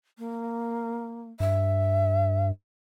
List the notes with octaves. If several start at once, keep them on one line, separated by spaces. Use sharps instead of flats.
A#3
G2 E5